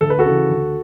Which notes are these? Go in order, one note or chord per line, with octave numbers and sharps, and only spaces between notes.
D2 A4
B4
F#4 A4
C#3 E3
D2